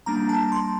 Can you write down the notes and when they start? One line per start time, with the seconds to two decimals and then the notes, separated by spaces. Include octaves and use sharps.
0.06 G3 A#3 D4 A#5
0.29 A5
0.52 C6